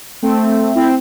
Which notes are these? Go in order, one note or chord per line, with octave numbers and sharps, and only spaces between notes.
A3 C4
C4 E4